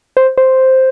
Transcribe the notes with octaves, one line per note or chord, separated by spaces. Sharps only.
C5
C5